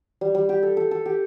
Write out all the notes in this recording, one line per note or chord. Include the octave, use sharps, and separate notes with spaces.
G3
G3
G4
A4
A4
A4
G4